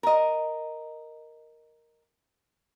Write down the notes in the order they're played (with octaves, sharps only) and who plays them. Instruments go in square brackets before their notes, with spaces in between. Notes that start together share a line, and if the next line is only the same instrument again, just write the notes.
[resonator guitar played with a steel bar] A#4 D#5